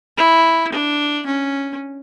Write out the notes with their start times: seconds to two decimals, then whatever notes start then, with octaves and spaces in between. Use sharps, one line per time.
0.17 E4
0.72 D4
1.26 C#4